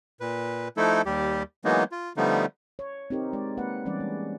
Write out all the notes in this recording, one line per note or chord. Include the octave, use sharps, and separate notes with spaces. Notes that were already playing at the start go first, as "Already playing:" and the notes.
A#2 B4
F3 A3 D#4 E4 A4
D#2 G3 G4
E3 F#3 G#3 A#3 B3 D#4
F4
D3 F3 G3 A3 B3 D#4
C#5
C4 D#4 G4 A#4
G#3 D5
A#3 B4 F#5
E3 G3 C#4 D5
G#3